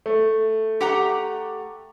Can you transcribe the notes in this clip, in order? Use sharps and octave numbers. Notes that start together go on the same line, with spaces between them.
A3
G4 F#5 A#5